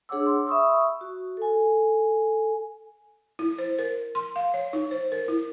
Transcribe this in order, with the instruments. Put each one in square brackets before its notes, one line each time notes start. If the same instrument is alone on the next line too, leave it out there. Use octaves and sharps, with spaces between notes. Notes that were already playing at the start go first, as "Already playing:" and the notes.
[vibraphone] D4 G#4 C#5 F#5 D6 E6
C6
E5 B5 C#6 D#6 E6
F#4
A4 G#5
[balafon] E4
C5
A#4
C6
F5
C#5
D#4
C5
A#4
E4